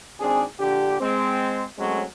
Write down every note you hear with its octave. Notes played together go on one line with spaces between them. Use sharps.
G#1 C4 D4 G#4
A#1 D3 G4
G#3 C4
F#3 G#3 A3 C4 C#4